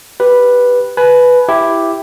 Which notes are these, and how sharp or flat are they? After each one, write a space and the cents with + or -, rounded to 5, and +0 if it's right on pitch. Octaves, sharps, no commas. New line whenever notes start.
G4 +0 B4 -5
B4 +0 G#5 +35
E4 +5 G4 +0